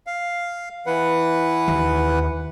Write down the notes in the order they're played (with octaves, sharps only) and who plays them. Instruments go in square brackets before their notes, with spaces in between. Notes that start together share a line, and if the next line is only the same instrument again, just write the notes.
[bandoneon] F5
E3 B4 F#5
[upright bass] D#2